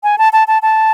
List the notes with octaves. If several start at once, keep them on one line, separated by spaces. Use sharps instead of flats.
G#5
A5
A5
A5
A5